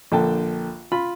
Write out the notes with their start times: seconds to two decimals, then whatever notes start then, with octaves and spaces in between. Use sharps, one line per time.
0.12 A#1 D3 G5 A5
0.92 F4 B5